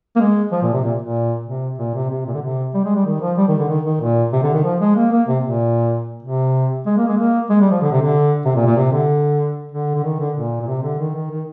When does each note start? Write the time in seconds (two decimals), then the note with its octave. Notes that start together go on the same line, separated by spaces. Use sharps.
0.16 A#3
0.20 G#3
0.52 F3
0.62 A#2
0.73 C3
0.83 A#2
1.02 A#2
1.46 C3
1.78 A#2
1.95 C3
2.10 C3
2.26 A#2
2.34 D3
2.42 C3
2.74 G3
2.85 G#3
2.95 G3
3.06 D#3
3.21 F3
3.37 G3
3.48 D#3
3.59 D3
3.69 D#3
3.85 D#3
4.01 A#2
4.33 C3
4.43 D3
4.54 D#3
4.64 F3
4.80 G#3
4.96 A#3
5.12 A#3
5.28 C3
5.44 A#2
6.23 C3
6.86 G#3
6.97 A#3
7.08 G#3
7.18 A#3
7.50 G#3
7.61 G3
7.71 F3
7.82 D3
7.92 C3
8.02 D3
8.45 C3
8.55 A#2
8.66 A#2
8.76 C3
8.92 D3
9.72 D3
9.95 D3
10.04 D#3
10.19 D3
10.35 A#2
10.61 A#2
10.67 C3
10.83 D3
10.99 D#3
11.15 D#3
11.30 D#3